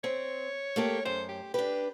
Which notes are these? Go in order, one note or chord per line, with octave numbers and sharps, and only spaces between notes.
C4 C#5
A3 A#3 G4
F#2 C5
G4
D4 G4 B4